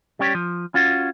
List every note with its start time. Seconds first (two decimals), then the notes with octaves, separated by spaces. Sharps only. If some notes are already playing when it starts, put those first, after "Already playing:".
0.19 G3 C#4 G4 C#5
0.35 F3
0.74 C#4 F4 F#4